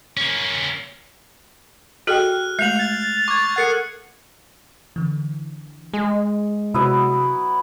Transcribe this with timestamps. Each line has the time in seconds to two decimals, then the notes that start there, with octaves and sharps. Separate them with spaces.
0.17 A#3 C#4
2.07 F#4 G#4 A4 D#5 G5 F6 F#6
2.59 G#3 A3 G6 C7 F7 F#7
2.79 A6
3.28 C#6 D6 G#6
3.56 A4 A#4 F#5 F#6 C7 C#7
4.96 D3 E3
5.94 G#3 G#4
6.74 C3 F#3 B3 E4 D#6